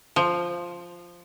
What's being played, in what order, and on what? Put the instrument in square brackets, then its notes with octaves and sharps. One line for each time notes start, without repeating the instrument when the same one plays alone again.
[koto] F3